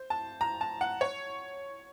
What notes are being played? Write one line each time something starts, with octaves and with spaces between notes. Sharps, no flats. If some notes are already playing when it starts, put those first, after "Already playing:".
Already playing: C5
A5
A#5
A5
F#5
C#5